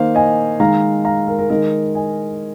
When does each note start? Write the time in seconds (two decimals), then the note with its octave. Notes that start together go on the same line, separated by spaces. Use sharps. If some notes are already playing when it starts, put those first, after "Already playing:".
Already playing: D#3 A#3 C5 F5
0.15 D#5 G#5
0.60 D#3 G#3 F5 A#5
1.05 F5 A#5
1.28 A#4
1.39 A#4
1.50 D#3 G#3 A#4 D#5
1.95 D#5 G#5